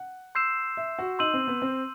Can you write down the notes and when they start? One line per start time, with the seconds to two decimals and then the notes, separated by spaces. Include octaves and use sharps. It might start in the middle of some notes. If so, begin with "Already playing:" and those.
Already playing: F#5
0.35 C6 E6 G6 C7 E7
0.77 E5
0.99 F#4
1.19 D#4 C6 E6 G6 D#7 F#7
1.34 C4
1.47 B3
1.62 C4